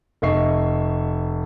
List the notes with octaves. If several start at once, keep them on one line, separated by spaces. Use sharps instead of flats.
F1 D#5 E5 C#6 C7